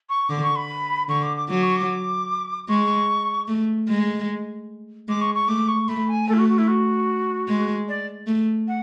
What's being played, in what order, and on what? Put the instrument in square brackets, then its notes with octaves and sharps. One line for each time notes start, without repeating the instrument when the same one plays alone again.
[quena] C#6
[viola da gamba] D3 [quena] D6
[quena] C#6
B5
[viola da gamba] D3 [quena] C#6
[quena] D6
D6
[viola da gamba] F#3 [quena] D6
[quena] C#6
D6
[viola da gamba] G#3 [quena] C#6
[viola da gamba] A3
G#3
[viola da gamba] G#3 [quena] D6
[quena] C#6
C#6
[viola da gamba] A3 [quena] D6
[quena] C#6
[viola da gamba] A3 [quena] B5
[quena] G#5
[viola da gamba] A3 [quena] A4
[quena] E4
F#4
F#4
E4
F#4
[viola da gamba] G#3
[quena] D5
[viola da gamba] A3
[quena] F#5